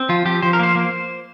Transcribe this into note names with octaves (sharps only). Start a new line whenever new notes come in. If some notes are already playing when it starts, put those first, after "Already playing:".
Already playing: C4
F3 F4
F3 G4
F3 C5
A#4
A#3 C5
A#3